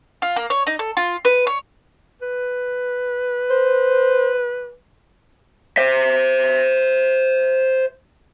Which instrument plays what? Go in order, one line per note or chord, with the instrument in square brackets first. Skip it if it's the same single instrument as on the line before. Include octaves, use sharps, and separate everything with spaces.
[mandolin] F4
A#3
C#5
D#4
A4
F4
B4
C#5
[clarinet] B4
[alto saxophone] C5
[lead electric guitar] C5 E5